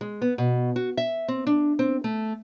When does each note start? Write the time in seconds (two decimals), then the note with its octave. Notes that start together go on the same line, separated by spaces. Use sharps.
0.01 G#3
0.22 B3
0.38 B2
0.76 F#4
0.97 E5
1.28 C4
1.47 D4
1.79 C4
2.04 A3